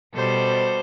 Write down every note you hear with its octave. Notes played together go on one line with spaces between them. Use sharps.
B2 G3 A4 C5